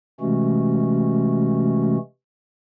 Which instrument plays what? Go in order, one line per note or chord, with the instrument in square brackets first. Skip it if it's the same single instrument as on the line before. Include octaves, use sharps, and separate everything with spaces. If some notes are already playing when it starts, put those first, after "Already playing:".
[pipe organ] C3 E3 G#3 A3 C#4 F#4